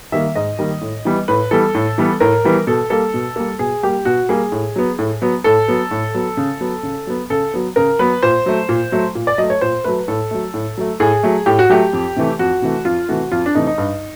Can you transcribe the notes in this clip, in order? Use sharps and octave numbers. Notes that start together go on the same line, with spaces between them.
D#3 G3 A#3 E5
G#2 D#5
D#3 G3 A#3
A2
E3 G3 B3
A2 B4
E3 G3 B3 A4
A2
E3 G3 B3
A2 A#4
E3 G3 B3
B2 A4
G3 A#3 A4
B2
G3 A#3
B2 G#4
G3 A#3 G4
B2 F#4
G3 A#3 G#4
A2
F#3 B3
A2
F#3 B3
A2 A4
F#3 B3
A2
F#3 B3
C#3
F#3 B3
C#3
F#3 B3
C#3 A4
F#3 B3
C#3 A#4
F#3 B3 B4
A#2 C5
F#3 A3
A#2
F#3 A3
A#2
D5
F#3 D#5
A3
C#5
A#2 C5
F#3 A3 B4
A2 A4
F#3 A3
A2
F#3 A3
A2 G#4
F#3 A3
A2 G4
F#4
F#3 A3 G4
F2
C3 E3 A3
F2 F#4
C3 E3 A3
F2 F4
C3 E3 A3 F#4
F2 F4
D4
C3 E3 A3 D#4
D#4
G2